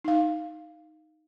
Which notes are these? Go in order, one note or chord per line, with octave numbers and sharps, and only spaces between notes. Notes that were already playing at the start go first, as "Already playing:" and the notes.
D#4 F5